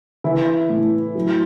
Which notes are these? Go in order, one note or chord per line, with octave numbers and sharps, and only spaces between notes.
E3 E4
A2
F#3